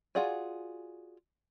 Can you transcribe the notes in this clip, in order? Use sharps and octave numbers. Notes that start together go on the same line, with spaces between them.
F4 F#4 G#4 D5 G#5